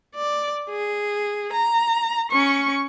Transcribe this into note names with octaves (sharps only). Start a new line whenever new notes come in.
D5
G#4
A#5
C#4 C#6